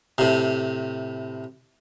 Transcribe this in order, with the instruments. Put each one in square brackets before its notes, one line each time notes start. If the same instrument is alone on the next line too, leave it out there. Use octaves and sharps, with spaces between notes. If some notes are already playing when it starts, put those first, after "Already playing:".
[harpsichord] A2 C3